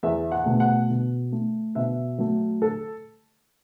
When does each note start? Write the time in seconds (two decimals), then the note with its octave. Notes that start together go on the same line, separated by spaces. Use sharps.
0.03 E2 E5
0.32 F#5
0.46 B2 A3
0.60 F#5
0.90 B2
1.32 A3
1.75 B2 E5
2.18 F#3 A3
2.62 A4